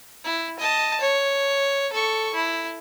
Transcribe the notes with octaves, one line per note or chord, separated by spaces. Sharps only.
E4
D#5 A5
C#5
A4 C#6
E4